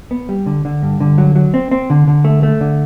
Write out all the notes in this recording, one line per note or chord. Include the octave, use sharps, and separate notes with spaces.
B3
G3
D3
D3
G2
D3
F#3
F#3
C4
C4
D3
D3
A3
A3
D3